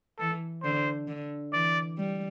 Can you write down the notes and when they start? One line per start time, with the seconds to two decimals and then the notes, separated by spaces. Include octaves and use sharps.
0.19 E3 A4
0.63 D3 C5
1.08 D3
1.53 E3 D5
1.98 G3